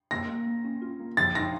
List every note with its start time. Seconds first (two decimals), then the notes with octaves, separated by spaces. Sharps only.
0.11 A#3 A#6
0.29 A#3
0.46 A#3
0.65 C#4
0.82 F4
0.99 A#3
1.17 F3 A6
1.35 D#4 A#6